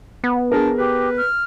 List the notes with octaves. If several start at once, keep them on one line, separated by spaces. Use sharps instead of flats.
B3
D4 G#4 A#4
G4 B4
F6